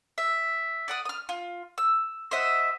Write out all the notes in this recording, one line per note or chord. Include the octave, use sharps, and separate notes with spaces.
E5
D5 F#5 D#6
D#6 F6
F4
E6
C5 D#5 E5 F#5